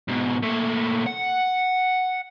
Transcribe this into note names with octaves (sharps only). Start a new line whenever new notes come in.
G#2 B2
A#2 A3
F#5